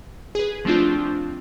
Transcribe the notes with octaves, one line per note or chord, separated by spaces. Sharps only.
G#4 B4
F3 A3 C4 D4 F4